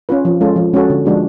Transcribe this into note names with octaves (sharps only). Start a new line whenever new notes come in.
C#4 F4 B4
F3
G#3 C#4 F4 A4
F3
G#3 C#4 F#4 A4
D3
F3 G#3 D4 F#4